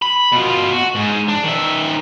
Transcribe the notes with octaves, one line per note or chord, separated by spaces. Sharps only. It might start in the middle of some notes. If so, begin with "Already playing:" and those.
B5
B2 F4
F#4
G#2
D4
D#3 E5